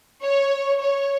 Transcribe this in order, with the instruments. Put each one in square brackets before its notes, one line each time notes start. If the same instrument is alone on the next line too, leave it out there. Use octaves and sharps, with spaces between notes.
[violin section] C#5
C#5